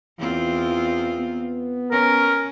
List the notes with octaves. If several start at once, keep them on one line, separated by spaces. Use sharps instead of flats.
E2 E3 C4 F4
B3
C#4 A#4